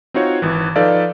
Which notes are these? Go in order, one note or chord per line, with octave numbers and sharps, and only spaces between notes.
C4 D#4 F4 F#4 C#5
G#1 E3
F3 D#4 A4 B4 D5 F5